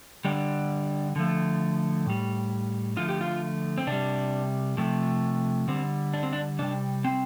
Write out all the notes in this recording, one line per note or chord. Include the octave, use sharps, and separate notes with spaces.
D3 G3 D4
D3 F3 A3
A2 G3
D3 F3 A3 F4
G4
F4
C4
C3 G3 D4
C3 F3 A3
D3 G3 C4
D4
C4
D4
C3 G3 D4
C4